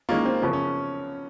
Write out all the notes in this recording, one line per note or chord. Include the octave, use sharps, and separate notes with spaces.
D#3 G#3 A#3 C#4 F4
C4
F#2 C#3 F3 B3
C#4